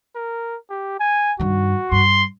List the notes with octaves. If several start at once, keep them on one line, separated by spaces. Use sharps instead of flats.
A#4
G4
G#5
G2 D#3 F#4
G2 C6